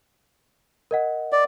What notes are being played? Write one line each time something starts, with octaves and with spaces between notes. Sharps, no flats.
A#4 D#5 F#5
D5